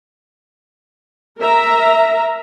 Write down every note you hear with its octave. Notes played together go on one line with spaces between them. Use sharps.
A#4 E5 A#5